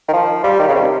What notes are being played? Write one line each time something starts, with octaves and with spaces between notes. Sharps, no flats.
D#3
F3
G3
D#3
C#3
C3